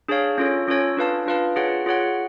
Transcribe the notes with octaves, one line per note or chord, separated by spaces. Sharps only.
D4 G#4 C#5 F5
C#4 F4 A4 C#5
C#4 F4 A4 C#5
D4 F4 B4 F5 A5
D4 F4 B4 F5 A5
F4 G#4 C#5 F#5
F4 G#4 C#5 F#5